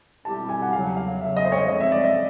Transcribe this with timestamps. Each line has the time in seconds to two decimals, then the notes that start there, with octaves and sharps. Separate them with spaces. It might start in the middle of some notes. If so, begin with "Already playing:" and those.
0.25 B2 G3 C4 E4 G4 A5
0.49 G#5
0.62 F#5
0.73 E2 C#3 F#3 F5
0.96 F5
1.20 E2 C#3 F#3 E5
1.36 D#5
1.45 C5
1.52 C#5
1.68 D2 D3 F3 G#3 C4 D#5
1.80 E5
1.92 D5
2.04 D#5